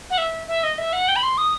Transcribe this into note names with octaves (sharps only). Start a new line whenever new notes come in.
F#5
E5
E5
D#5
E5
F#5
G5
B5
C6
D#6